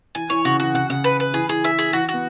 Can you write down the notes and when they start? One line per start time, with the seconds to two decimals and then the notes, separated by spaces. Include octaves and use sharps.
0.15 E3 G#5
0.30 E3 C#5
0.45 C#3 F#4
0.60 E3 F#4
0.74 C#3 F#5
0.89 C#3 F#5
1.04 B4
1.20 B4
1.34 E3 G#4
1.49 E3 G#4
1.64 E5
1.79 G#4
1.93 E3 F#4
2.09 B3 F#4